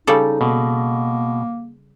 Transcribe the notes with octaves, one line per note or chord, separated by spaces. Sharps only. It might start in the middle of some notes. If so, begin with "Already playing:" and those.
C#3 G3 D#4 A4
B2 A#3